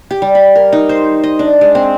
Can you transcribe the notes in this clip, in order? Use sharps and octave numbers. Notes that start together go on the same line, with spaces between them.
G4
G3
B5
A#4
D#4
C5
D#5
D4
G#3
C4